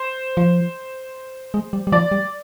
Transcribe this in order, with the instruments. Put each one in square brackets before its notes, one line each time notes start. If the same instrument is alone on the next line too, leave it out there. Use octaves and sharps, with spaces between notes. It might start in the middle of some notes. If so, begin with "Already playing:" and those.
Already playing: [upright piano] C5
[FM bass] F3
G#3
G3
G3
[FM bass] F3 [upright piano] D5
[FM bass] G3